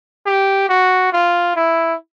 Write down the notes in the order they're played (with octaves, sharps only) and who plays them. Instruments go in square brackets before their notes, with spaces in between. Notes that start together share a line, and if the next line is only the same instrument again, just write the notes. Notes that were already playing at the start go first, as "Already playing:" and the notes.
[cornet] G4
F#4
F4
E4